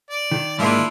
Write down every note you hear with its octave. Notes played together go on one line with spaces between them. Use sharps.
D5
D#3
G#2 D#3 A#3 D4 E4 F4